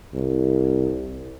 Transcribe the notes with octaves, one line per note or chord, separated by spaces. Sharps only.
C2